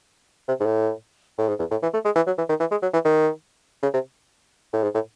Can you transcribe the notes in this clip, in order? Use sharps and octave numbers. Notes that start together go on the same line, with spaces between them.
C3
G#2
A2
A2
G#2
E2
A2
E3
A3
G#3
E3
F#3
E3
D#3
E3
G#3
F#3
E3
D#3
C#3
C3
A2
G#2
A2